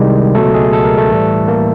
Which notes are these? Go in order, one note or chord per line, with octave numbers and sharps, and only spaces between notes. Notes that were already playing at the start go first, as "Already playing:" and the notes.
Already playing: C2 C3 D#3 G3 G#3 G4
C#2 B2 F#3 A3 A4
G#3 G#4
A4
A#4
A3 A4
A2 E3 G3
A#3 A#4